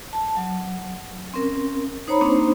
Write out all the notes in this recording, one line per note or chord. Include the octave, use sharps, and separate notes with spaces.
A5
F#3
C4 C#4 A#4
D#4 C5 C#5 A#5 B5
A#3 C4 D4 D#4 C5